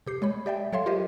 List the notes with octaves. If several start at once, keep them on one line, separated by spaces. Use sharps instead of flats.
C3 G4 C7
G#3 C#5 B5
G4 D5 E5 G5
F#3 A4 C#5 E5 F5 C6
F4 G4 A#4 C5 D#5 E5